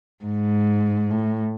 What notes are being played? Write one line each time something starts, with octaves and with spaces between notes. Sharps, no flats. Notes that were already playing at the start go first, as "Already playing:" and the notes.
G#2
A2